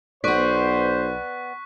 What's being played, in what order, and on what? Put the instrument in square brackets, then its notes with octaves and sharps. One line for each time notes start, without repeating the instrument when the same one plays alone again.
[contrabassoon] B1 [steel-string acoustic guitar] B3 D5 [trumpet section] C5 [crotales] C#6 F#6 B6